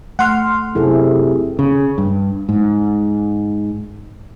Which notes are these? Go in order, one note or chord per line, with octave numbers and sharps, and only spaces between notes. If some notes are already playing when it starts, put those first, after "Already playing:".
A3 F#5 C6 F6
F#2 C3 E4 G#4 A4
C#3
G2
G#2